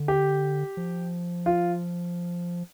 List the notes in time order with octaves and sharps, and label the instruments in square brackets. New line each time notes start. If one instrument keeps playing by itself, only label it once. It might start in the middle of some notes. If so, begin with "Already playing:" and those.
Already playing: [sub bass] D3
[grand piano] G4
[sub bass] F3
[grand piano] F4